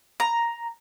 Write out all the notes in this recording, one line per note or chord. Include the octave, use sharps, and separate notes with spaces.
A#5